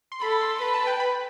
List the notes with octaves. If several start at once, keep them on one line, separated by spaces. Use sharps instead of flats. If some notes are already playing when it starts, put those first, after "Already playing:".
C6
A4 B5
C6
B4 B5
A5
G5
B5